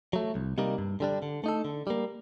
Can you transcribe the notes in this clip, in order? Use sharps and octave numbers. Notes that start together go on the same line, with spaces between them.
F#3 A3
C2
C3 G3 A#3 D#4
G2
D3 G3 D4
D3
A3 D#4 A4
D3
G3 A#3